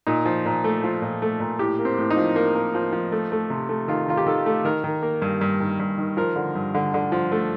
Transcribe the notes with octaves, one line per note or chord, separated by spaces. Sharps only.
A#2 D#4
F3
A#2
A3
F3
A#2
A3
A#2
A2 G4
A#3
C4
A2
D#4
F3
A#3
A#3
F3
F3
A3
A3
C3
A3
D#3 F4
D#3 F4
G4
D#3 A4
A3
D#3 A#4
D#3
A#3
G2
G2
D#3
G2
D#3
F3 A#4
D3
G2
D3
D3
F3
A3